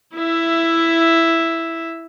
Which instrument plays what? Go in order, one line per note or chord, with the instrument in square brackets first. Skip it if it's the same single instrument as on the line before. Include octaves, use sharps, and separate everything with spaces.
[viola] E4 E5